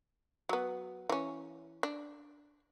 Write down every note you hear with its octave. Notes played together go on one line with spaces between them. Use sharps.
F#3 B3
E3 C#4
D4